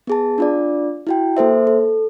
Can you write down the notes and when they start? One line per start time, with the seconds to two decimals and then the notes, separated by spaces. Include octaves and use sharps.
0.07 B3 G#4 A5
0.38 D4 F4 D5
1.07 E4 F#4 G5
1.37 A#3 A4 C5 E5
1.67 A4